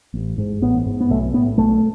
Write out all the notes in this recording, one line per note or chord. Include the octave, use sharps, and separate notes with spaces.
A1
G#2
A1 B3
G#2
B3
B1 A3
A2 B3
B1 A3